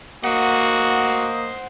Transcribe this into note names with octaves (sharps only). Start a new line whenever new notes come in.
A#3 F#4 C5 D#5 F#5